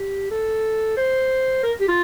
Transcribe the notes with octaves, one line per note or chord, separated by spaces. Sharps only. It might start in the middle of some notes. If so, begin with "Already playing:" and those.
Already playing: G4
A4
C5
A#4
G4
F4